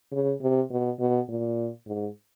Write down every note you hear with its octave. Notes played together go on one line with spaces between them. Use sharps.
C#3
C3
B2
B2
A#2
G#2